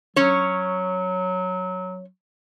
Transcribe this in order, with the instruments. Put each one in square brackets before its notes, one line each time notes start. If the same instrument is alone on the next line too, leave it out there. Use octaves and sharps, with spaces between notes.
[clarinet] F#3 [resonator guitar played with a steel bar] C#4 C#5